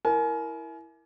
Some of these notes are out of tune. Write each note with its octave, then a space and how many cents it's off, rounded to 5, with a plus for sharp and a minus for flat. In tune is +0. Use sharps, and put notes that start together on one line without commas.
E4 +0 A#4 +0 G#5 +35